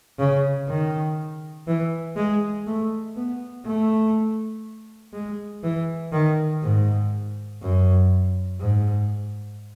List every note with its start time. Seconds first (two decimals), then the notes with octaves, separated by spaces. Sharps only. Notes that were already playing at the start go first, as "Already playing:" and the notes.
0.19 C#3
0.68 D#3
1.68 E3
2.16 G#3
2.66 A3
3.16 B3
3.65 A3
5.13 G#3
5.64 E3
6.12 D#3
6.63 G#2
7.61 F#2
8.60 G#2